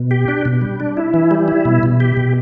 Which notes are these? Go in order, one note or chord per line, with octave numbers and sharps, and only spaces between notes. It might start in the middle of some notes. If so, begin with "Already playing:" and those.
Already playing: B2
G4
D4
B2
G3
D4
E4
E3
G3
E4
B2
B2
G4
B2